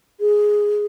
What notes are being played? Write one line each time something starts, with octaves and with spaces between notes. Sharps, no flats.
G#4